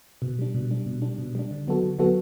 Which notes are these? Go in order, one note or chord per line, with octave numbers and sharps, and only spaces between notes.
B2
G3 D4
B2
G3 D4
B2
G3 D4
B2
G3 D4
D3
F#3 B3 F#4 A4
D3
F#3 B3 F#4 A4